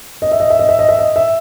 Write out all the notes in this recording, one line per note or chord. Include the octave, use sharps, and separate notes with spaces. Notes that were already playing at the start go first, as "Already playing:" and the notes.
D#5
E5
D#5
E5
D#5
E5
D#5
E5
D#5
E5